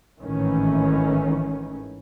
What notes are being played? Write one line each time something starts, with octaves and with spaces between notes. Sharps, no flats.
G#1 A2 D#3 E3 C#4